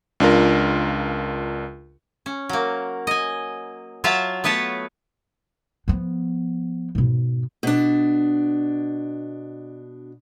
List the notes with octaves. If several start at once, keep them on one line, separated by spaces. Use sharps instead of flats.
C#2 D4 F4 A#4
C#4
F#3 A#3
D#5 G#5
F#3 F4 E5 F5 A5
A3 B3 B4 C#5 A5
F3 B3
G#2 B2
B2 D4